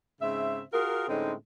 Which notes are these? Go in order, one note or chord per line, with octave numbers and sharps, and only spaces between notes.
G#2 C#3 C4 E5
F4 F#4 G#4 A#4
A2 D3 G#3 C4 C#4 D#4